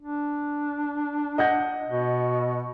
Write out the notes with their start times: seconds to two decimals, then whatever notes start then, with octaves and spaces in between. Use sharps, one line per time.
0.02 D4
1.38 D#5 F#5 G6
1.89 B2